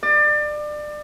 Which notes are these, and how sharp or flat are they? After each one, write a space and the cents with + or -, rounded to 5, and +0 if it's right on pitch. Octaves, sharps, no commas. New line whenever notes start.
D5 +30